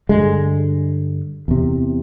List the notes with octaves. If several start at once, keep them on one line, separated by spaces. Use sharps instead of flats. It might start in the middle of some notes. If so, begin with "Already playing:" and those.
G2 D3 G#3
E2 C3